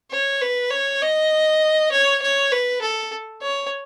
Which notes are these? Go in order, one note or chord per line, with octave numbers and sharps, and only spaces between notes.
C#5
B4
C#5
D#5
C#5
C#5
B4
A4
C#5